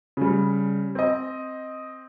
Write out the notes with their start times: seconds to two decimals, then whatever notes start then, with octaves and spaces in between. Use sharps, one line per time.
0.17 C#3 G3
0.95 C4 D#5